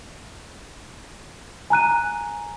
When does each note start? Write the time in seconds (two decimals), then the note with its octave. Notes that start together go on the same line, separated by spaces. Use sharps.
1.70 G#5 A#5 F#6 D#7